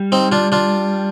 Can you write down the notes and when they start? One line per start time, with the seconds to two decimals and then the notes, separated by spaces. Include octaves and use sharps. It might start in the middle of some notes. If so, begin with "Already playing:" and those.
Already playing: G3
0.12 C4 D#4
0.32 D4 F4
0.52 D4 F4